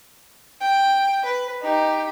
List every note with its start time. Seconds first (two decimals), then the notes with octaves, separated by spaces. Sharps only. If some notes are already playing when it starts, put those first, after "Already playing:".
0.60 G5
1.24 B4
1.62 D#4 G4